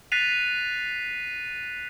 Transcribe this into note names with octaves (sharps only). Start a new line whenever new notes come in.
F#6 A6 B6 C7 D#7 F7